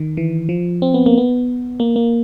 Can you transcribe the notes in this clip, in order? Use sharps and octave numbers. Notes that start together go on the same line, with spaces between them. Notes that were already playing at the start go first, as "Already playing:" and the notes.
Already playing: D#3
E3
F3
C4
B3
A#3
B3
A#3
A#3